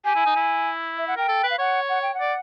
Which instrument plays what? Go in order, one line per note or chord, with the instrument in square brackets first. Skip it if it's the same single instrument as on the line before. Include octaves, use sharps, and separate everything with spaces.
[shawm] G4 [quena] G#5
[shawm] E4
D#4
E4
[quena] E5
F#5
[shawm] A#4 [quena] G5
[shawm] A4
B4
[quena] F5
[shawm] C#5 [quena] F#5
[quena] F#5
G5
F#5
[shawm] D5